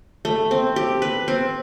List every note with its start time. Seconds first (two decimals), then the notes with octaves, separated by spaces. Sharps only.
0.25 A3
0.51 C4
0.76 G4
1.02 B4
1.28 C4